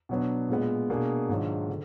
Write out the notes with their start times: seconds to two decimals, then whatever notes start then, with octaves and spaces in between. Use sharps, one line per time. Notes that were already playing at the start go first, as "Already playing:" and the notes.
0.09 B2 F#3 B3 D4
0.49 A#2 G#3 B3
0.90 B2 A#3 D4 G#4
1.29 G#2 D#3 F#3 D4 F4
1.69 D3